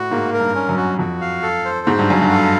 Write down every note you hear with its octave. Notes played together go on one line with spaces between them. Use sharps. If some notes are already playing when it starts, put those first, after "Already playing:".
Already playing: A2 F#4
G#2 A#3
A#4
G2
C#4
F#2
F#4
F2 F#4
F5
A4
C5
G#2 F#4
G2
F#2 F5
G2
A4